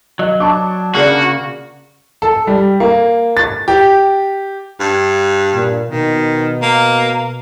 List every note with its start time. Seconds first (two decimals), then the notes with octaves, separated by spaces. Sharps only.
0.19 F#3 D#5
0.40 D4 A5 C#6 D6
0.95 C#3 A#3 F#4 G#4 D5 F#5
2.22 A4
2.47 G3
2.80 A#3
3.37 A6
3.68 G4
4.80 G2
5.54 A#2
5.90 B2 D#3
6.62 A#3